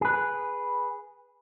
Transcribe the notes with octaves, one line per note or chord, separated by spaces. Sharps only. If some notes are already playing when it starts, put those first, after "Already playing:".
G#4 B4